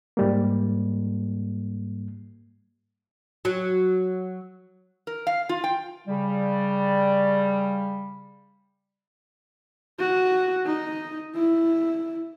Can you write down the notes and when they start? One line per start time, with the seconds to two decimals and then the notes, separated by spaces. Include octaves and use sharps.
0.17 G#2 G3 A#3
3.45 F#3
5.07 A#4
5.27 F5
5.49 F4
5.64 G5
6.07 C#3 G3
9.99 F#4
10.66 D#4
11.35 E4